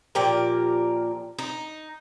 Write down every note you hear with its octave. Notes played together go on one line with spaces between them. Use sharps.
A#2 F3 G4 A#4
D#4